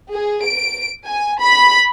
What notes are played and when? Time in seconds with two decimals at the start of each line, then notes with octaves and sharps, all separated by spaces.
0.12 G#4
0.43 D7
1.06 G#5
1.41 B5